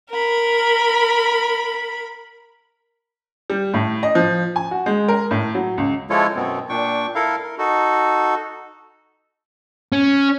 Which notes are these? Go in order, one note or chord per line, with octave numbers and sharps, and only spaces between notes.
A#4 B5
G3
A2
D#5
F3
G#5
F#4
G#3
A#4
A2
F#3
C#2
F3 G#3 E4 F4 A4 C#5
F#2 B2 B3 C4
A#2 D4 G5 C#6
E4 A4 A#4 F5
A#4
D#4 F#4 A4
C#4